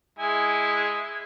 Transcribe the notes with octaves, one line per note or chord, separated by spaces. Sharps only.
G#3 E4 G#5